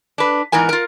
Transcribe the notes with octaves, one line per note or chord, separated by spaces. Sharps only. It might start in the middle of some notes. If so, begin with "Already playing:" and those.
D4 B4
G#2 E3 B3 A#4 G#5
F4 A#4